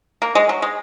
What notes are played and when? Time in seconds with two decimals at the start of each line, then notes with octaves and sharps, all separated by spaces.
0.22 A#3
0.35 G#3
0.49 F#3
0.62 G#3